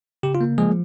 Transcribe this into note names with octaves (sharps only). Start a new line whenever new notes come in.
C#3 G4
F4
A#3
F3 G#3 G#4